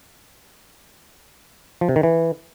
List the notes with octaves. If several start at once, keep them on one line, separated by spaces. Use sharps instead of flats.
F3
C3
D#3
E3